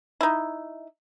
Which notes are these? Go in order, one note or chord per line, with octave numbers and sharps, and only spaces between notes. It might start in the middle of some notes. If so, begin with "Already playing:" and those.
D#4 E4